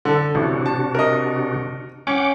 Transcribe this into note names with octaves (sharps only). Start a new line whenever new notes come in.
D3 A4
A1 C3 D4 F#4
A5
A#4 D#5
C#4 F#5 G5 D6